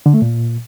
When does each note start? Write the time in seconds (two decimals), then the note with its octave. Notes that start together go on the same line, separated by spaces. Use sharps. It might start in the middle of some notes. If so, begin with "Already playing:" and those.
0.06 D3
0.14 A3
0.22 A#2